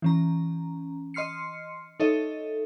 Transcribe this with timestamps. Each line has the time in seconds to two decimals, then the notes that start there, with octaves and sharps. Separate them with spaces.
0.02 E3 C#4 A#5
1.14 D#5 C6 F6 C7 C#7
2.00 D#4 A4 C#5 D#5 E5